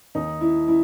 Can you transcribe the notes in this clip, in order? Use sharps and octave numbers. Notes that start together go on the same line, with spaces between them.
D#2 D#3 D#4
E4
E4